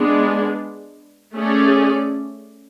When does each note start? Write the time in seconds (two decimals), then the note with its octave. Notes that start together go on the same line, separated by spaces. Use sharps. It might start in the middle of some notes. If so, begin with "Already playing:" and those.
Already playing: G#3 B3 D4
1.34 A3 C#4 G#4 D5